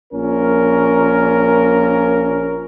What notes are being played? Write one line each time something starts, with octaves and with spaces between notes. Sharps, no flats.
A#1 A#2 C#4 A#4